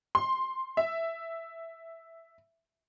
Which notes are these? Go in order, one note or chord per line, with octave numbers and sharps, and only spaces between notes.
C6
E5